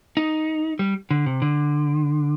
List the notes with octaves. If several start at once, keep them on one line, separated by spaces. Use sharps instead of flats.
D#4
G3
D3
C3
D3